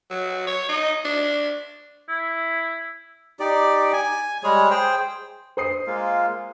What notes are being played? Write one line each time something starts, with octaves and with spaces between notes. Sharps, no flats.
F#3
C#5
D#4
D4
E4
D#4 G4 D5
G#5
G3 G#3 G#4 C#5
G#4 C5 G5
C5 D#6 C7
G#3 A#3 F4